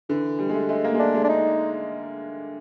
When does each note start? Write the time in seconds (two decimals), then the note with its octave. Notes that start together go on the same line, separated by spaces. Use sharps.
0.09 D3 E3
0.39 G3
0.49 G#3
0.54 A3
0.69 G#3 A3
0.85 A#3
0.94 G#3
0.99 A3 D4
1.14 G#3
1.24 D4
1.29 D#4